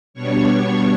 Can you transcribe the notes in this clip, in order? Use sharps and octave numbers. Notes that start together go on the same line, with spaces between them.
B2 G3 B3 D4 C#5 C#6